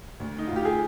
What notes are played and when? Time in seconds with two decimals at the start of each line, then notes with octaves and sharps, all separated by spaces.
0.20 D2
0.38 D#4
0.47 D2 F4
0.56 G4
0.65 G#4